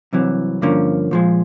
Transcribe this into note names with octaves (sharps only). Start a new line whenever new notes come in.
C2 C3 E3 F#3
G2 D3 F3 A#3 C#4
A#2 F3 G#3